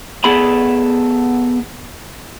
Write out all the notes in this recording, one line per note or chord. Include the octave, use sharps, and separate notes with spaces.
B3 G#4 A4 A5 B5